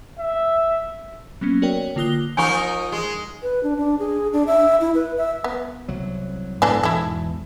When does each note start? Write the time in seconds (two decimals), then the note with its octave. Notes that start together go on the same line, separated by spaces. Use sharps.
0.19 E5
1.41 F#3 A#3 B3 C#4
1.62 F#4 A#4 C#5 D5 G5
1.96 D3 A#3 F4 D#6 F#6 G7
2.37 F3 D#4 A#4 G#5 C#6
2.92 G#3
3.43 B4
3.63 D4
3.77 D4
3.99 G#4
4.33 D4
4.47 E5
4.80 E4
4.95 B4
5.18 E5
5.44 B3
5.88 C2 F#3
6.62 G#2 E3 B3 D4 A4
6.83 E2 G#2 B2 E4 A4